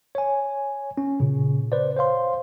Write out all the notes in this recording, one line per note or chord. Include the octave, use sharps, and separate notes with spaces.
C#5 G#5
C#4
A#2 C#3
B4 C5 D5
C5 C#5 F5 C6